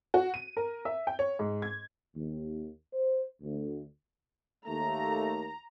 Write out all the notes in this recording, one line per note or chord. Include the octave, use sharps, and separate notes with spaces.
F#4
D#7
A#4
E5
G5
C#5
G#2
G#6
D#2
C5
D2
D#2 A3 A#3 A#5